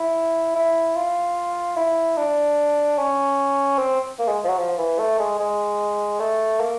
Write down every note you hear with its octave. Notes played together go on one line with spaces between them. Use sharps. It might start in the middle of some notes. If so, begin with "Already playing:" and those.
Already playing: E4
E4
F4
E4
D4
C#4
C4
A#3
G#3
F3
F#3
F3
E3
A3
G#3
G#3
A3
A#3